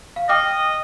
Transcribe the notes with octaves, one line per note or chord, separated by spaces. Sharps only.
F5
D#5 G5 D6 F6